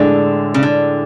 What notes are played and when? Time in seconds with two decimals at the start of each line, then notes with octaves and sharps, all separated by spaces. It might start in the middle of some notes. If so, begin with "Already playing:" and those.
Already playing: A2 D3 G#3 D4
0.54 C#3
0.63 D3